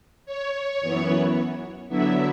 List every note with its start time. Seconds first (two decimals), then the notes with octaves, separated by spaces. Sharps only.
0.26 C#5
0.80 F#2 E3 B3 E4
1.89 D3 F#3 B3 E4 E5